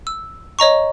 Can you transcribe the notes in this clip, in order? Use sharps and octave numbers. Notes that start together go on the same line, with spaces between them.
E6
C#5 D#5 A#5 C#6